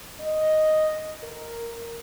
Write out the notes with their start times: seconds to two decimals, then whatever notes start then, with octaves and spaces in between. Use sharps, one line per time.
0.20 D#5
1.23 A#4